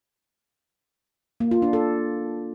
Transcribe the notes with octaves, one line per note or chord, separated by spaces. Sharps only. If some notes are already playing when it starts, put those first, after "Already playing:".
A#3
F4
D4
A4